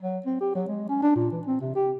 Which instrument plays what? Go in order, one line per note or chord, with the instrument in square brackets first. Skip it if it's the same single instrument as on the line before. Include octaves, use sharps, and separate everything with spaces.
[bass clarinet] F#3
C4
G4
F#3
G#3
C#4
D4
A#2
E3
C4
C3
G4